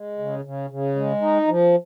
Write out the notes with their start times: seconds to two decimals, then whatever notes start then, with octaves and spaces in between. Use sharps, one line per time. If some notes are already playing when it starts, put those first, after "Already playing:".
Already playing: G#3
0.19 C#3
0.45 C#3
0.70 C#3
0.96 G#3
1.22 D#4
1.47 F3